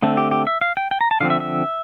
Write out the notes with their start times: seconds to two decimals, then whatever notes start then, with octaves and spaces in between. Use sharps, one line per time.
0.03 D3 A3 C4
0.17 G4
0.31 G4
0.47 E5
0.61 F5
0.77 G5
0.91 G5
1.01 A#5
1.11 A5
1.20 D3 F3 C4 F5
1.30 E5
1.40 E5